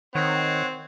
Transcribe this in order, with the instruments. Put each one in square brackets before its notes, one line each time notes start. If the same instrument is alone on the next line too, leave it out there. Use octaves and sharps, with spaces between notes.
[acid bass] D#3 [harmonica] C4 [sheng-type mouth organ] C#5 F#5